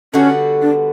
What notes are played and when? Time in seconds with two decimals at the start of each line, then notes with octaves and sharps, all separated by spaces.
0.13 D3 G3 B3 C#4 F#4
0.62 D4